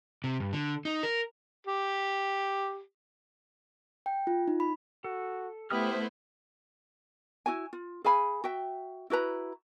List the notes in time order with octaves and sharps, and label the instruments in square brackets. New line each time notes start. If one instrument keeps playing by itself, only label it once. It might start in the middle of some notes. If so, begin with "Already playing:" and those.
[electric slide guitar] C3
G2
D3
D#4
A#4
[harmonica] G4
[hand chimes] G5
F4
D#4
B5
[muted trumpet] F#4 [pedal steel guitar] A4
[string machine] A3 C5 [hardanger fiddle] B3 E4 [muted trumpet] G4 [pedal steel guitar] E5 D#6 F6
[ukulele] E4 F#4 G#5
F4
G#4 F5 G#5 B5
F#4 E5 G5
E4 F#4 B4 A#5